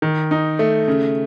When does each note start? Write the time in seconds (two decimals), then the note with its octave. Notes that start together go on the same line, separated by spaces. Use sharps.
0.02 D#3
0.31 D#4
0.59 A3
0.88 C#3